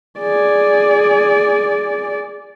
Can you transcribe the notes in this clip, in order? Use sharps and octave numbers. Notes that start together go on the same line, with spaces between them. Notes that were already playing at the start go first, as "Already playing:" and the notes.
G#4 D5